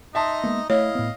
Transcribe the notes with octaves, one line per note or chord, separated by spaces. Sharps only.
D#4 D#5 E5 A5 C6
G#3 A#3 B3
A3 E4 C#5 D#5 F5
A2 B3